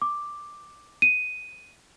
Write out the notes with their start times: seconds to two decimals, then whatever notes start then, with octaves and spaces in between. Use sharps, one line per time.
0.02 D6
1.02 D#7